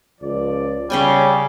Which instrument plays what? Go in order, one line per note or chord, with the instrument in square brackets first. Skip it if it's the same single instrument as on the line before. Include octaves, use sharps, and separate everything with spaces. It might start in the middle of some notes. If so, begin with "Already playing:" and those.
[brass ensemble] C#2 F3 D5
[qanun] C#3 G5 G#5 [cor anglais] G3 [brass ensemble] C#5